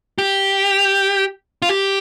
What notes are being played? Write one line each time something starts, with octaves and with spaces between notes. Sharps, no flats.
G4
F4
G4